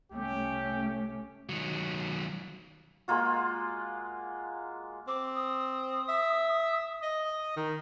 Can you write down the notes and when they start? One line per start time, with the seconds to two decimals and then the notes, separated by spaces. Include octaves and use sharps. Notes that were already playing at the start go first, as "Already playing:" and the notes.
0.11 C2 A3 C#4 G4
1.49 D#3 F#3
3.08 G#3 A#3 F4 F#4
5.08 C4 D6
5.35 D#6
6.09 E5
7.03 D#5
7.57 D#3 A#5